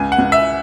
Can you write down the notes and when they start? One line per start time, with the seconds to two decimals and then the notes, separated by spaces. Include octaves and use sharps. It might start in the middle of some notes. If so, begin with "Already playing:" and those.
Already playing: C#2 G#5
0.12 F#5
0.19 C#2
0.32 E5